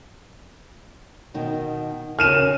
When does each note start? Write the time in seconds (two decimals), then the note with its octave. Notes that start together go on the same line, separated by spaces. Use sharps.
1.34 B2 D#3 D#4
2.19 C#3 F#4 A#4 F6 D#7 E7